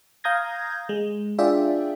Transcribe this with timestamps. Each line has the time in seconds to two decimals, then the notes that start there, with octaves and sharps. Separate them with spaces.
0.24 F5 A#5 D#6 G6 G#6 A#6
0.89 G#3
1.38 D4 F4 G#4 D5 E5 G5